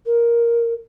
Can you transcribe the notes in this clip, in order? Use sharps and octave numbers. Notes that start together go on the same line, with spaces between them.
A#4